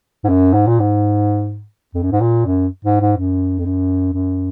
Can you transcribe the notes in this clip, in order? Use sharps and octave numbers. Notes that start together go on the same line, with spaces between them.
G#2
F#2
G#2
A#2
G#2
F2
F#2
G#2
A#2
F#2
G#2
G#2
F#2
F2
F#2
F#2